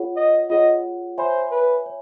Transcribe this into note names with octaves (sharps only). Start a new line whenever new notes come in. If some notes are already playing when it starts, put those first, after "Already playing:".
Already playing: F4 G#4 C#5 F#5
D#5
F4 G#4 C#5 D#5 F#5
C5 C#5 E5 G#5 B5
B4
C#5